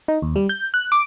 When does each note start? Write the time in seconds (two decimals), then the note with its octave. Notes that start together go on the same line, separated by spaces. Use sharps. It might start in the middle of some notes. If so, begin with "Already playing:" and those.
0.08 D#4
0.22 D#2
0.36 G3
0.49 G6
0.74 F#6
0.92 D6